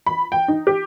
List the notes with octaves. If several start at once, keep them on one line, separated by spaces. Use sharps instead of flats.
B5
G5
D#4
G4